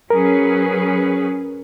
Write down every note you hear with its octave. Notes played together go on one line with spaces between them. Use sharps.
F#3 C#4 G#4 A#4 B4